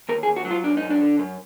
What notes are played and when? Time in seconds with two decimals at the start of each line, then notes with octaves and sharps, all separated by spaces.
0.09 D#2 A#4
0.23 G#4
0.28 D#2
0.36 F#4
0.45 F#3
0.51 F4
0.64 F#2 D4
0.77 D#4
0.82 F#2
0.90 D4
1.01 D3
1.19 F#2